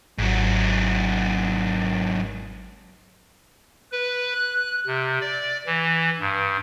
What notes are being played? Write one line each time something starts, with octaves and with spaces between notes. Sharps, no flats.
G#1 G#2 F#3
B4
F#6
C3
D5
E3
G2